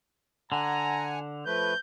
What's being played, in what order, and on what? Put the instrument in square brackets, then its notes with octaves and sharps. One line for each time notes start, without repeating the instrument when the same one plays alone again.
[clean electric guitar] D3 [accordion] F#5 G#5 [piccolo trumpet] A#5
[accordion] F3 A3 B4 [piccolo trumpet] G6